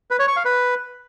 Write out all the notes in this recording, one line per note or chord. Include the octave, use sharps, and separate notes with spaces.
B4
C#5
C#6
F5
B4